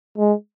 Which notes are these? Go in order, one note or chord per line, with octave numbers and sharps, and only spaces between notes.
G#3